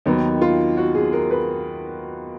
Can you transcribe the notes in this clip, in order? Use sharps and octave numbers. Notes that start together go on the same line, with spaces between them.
D#2 D#3 F#3 B3 D#4
F4
F#4
G#4
A#4
B4